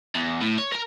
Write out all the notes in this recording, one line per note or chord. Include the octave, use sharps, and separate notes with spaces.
E2
A2
C#5
A#4 A#5